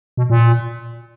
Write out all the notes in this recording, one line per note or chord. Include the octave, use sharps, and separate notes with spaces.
B2
A#2